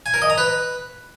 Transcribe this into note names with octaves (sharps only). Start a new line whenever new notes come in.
G#5
A#4
D#5
A#5
B4